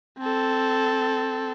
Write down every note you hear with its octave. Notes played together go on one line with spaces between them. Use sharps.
C4 A4